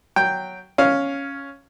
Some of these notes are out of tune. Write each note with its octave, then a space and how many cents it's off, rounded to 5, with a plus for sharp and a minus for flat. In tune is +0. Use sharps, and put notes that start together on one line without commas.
F#3 +5 G5 +0
C#4 +0 F5 +0